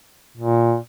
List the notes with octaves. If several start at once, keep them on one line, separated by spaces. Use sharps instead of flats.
A#2